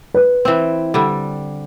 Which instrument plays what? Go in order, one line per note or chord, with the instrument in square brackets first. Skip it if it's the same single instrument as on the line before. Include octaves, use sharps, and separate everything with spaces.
[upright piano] B4
[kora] E3 C4
D3 G3